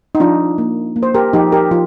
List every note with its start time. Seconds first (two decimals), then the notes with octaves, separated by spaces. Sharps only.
0.15 D#4
0.20 F3 D4 F4
0.58 A#3
0.96 A#3
1.03 C5
1.14 G4 A#4
1.33 F3 D#4 G4
1.52 G4 A#4
1.71 F3 F4